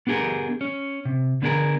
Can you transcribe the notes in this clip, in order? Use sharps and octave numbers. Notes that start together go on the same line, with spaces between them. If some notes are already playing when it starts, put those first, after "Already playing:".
B3 D4 G4 G#4 A#4
C#4
C3
D3 B3 D4 G#4 A#4